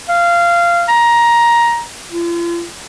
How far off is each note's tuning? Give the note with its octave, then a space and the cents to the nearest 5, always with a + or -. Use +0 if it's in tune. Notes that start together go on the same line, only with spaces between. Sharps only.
F5 -20
A#5 +15
F4 -40